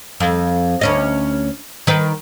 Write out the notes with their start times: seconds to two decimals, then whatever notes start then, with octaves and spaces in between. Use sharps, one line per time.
0.20 F2
0.81 D2 C#4 D#5
1.87 D#3 B4